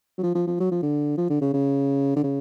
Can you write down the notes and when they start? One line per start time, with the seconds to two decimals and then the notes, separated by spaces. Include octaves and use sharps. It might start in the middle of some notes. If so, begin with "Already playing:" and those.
0.18 F#3
0.23 F3
0.35 F3
0.47 F3
0.60 F#3
0.71 F3
0.83 D3
1.18 F3
1.30 D3
1.41 C#3
1.54 C#3
2.16 D3
2.24 C#3